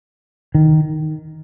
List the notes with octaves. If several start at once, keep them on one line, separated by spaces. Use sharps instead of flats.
D#3